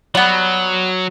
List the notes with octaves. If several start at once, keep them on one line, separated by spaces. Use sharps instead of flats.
F#3 G3 B3